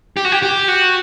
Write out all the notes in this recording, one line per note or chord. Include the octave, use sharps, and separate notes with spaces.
G4
F#4
G4
G4
F#4